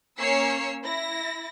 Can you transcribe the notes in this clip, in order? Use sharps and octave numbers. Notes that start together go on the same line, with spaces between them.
A#3 C#4 C#5 E6 C7 C#7
E4 A#6